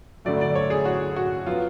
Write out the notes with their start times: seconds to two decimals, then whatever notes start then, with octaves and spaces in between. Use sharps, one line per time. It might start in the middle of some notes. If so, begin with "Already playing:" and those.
0.25 D2 D3 F#3 A3 D5
0.41 D5
0.55 C#5
0.70 G#4
0.85 F#4
1.16 F#4
1.46 F#3 B3 F4